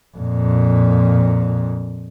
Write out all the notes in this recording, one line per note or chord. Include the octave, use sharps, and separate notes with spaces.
F2 A#2